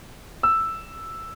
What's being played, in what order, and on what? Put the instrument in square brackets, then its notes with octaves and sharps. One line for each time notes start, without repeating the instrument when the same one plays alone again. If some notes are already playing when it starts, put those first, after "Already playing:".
[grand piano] E6